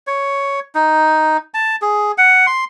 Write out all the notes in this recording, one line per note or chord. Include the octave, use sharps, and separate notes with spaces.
C#5
D#4
A5
G#4
F#5
C6